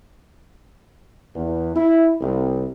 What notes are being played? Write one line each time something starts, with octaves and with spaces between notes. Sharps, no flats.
E2
E4
C2